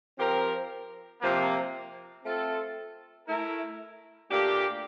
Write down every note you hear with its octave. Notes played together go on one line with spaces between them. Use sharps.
F3 C4 G4 A#4
C3 F3 A#3
A3 C4 F4 A4
A3 E4 A#4
A#2 A3 D4 G4